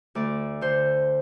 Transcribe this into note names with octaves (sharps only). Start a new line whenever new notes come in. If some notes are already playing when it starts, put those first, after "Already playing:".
D2 D5
D3 C5